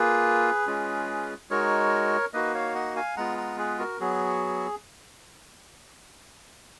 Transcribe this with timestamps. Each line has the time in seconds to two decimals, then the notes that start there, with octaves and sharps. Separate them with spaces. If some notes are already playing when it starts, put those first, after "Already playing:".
Already playing: A#3 F4 G#4 B4
0.67 G#3 C#4 F4
1.50 G#3 D#4 F#4 A#4 C#5
2.33 A#3 D#4 F#4 B4 D#5
2.54 C#5 F5
2.75 D#5 F#5
2.96 F5 G#5
3.17 G#3 B3 F4 F#5 A#5
3.38 F#5 A#5
3.58 G#4 B4
3.79 F#4 A#4
4.00 F#3 B3 F#4 G#4